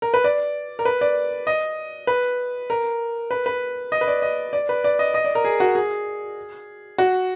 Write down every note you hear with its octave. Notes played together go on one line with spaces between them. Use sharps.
A#4
B4
D5
A#4
B4
D5
D#5
B4
A#4
B4
B4
D#5
B4
D5
D#5
D5
B4
D5
D#5
D#5
D5
A#4
G#4
F#4
G#4
F#4